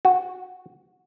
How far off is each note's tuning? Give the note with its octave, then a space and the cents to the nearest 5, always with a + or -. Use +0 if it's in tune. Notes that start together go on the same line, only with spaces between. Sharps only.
F#4 -10